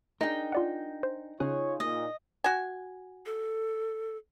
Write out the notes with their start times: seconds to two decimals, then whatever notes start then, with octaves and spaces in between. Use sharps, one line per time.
0.21 D4 D#4 G#4 A#4 G5
0.52 F4 D5 F#5
1.03 C5
1.40 C#3 C#4 D#4 F4 G#4 C#5 F#6
1.80 A#2 D#5
2.44 F#4 G#5
3.26 A4